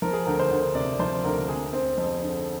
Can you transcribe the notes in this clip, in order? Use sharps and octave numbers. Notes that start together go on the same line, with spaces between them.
F3 A#4
G#4
D2 A#4
C5
D2
C3 D5
F3 C5
D2 A#4
G#3 G#4
C4
F2
D3